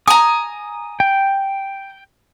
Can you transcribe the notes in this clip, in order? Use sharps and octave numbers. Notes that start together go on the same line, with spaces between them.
G#5 A#5 D#6
G5